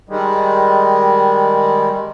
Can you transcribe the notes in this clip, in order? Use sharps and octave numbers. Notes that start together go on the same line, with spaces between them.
D#3 G3 G#3